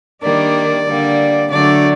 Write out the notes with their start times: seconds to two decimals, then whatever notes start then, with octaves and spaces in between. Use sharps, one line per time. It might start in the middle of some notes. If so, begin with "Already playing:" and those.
0.23 D#3 G3 A#3 D4 D5
0.86 D3 G3 A#3
1.50 D3 F#3 A3 D5